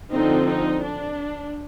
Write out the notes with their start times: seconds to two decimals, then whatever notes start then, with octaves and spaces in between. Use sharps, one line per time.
0.13 D3 F3 C4 D#4
0.48 D#4
0.83 D4